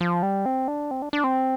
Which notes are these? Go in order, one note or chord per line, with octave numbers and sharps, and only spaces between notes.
F3
G3
C4
D4
C4
D4
D4
C4